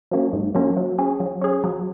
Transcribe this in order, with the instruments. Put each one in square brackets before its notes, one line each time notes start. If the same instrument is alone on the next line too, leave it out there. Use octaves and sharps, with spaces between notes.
[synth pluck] F#3 A#3 C#4
G#2
F#3 A#3 C#4
F#3
C#4 G#4
F#3
C#4 G#4
F#3